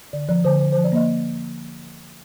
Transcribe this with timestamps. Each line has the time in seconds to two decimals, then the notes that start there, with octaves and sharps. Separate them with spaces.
0.13 D3 D5
0.29 F3 D5
0.44 D3 C5
0.60 D3 C5
0.72 C5
0.77 F3
0.84 D5
0.92 A#3 D#5